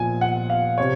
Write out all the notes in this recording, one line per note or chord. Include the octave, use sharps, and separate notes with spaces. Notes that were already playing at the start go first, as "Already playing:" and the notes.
Already playing: A#2 F3 G#5
F#5
F5
C3 C#5